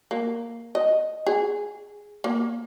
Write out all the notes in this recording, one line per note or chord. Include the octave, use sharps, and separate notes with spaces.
A#3
D#5
G#4
A#3